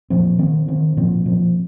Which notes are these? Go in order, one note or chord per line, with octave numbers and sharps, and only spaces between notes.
A#2 F3 C4
D#3 C4
D#3 C4
A#2 F3 C4
A#2 F3 C4